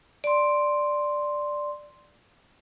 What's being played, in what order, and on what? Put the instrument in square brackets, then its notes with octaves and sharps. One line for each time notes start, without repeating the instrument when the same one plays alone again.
[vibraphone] D5 C6